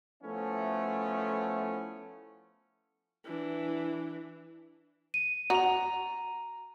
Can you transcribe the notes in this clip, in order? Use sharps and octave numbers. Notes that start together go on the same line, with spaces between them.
F3 A3 B3 C#4 E4
E3 D4
D#7
F#4 A#5 F7